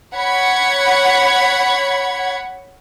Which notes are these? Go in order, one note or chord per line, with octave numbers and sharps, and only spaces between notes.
C#5 F#5 B5 G#6